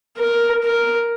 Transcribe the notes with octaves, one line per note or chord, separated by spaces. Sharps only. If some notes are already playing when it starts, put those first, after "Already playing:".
A#4
A#4